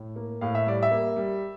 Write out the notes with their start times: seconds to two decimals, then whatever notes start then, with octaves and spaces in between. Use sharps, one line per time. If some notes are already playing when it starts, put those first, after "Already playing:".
Already playing: A2
0.16 A#3
0.41 A2 F5
0.55 E5
0.67 G3 D5
0.83 E5
0.91 A#3
1.16 G3